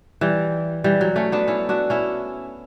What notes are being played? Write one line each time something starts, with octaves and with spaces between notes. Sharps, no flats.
E3 G3
E3 G3
F#3
A3 C#4
B3 D4
C#4 E4
D4 F#4
C#4 E4